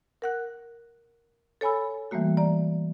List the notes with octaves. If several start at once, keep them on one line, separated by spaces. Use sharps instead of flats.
A#4 F#5 F#6
A4 C#5 G#5 B5 E6
E3 G3 A3 A#3 F#4
D5 A#5